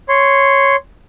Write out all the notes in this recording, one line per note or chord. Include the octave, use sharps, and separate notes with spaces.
C#5 C6